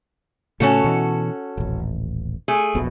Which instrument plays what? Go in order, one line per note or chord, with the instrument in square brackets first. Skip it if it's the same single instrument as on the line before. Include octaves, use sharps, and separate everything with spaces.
[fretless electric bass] A2 C#3 A3 [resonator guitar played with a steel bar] C#4 F#4 A4
[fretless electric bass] B2 E3
D#1 A1
[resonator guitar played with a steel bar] A3 G#4
[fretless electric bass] E1 A#1 B2